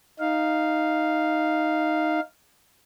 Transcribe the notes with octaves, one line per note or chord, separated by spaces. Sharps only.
D#4 F5